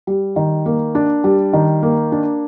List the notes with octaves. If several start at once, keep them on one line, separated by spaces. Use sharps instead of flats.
G3
D#3
A#3
D4
G3
D#3
A#3
D4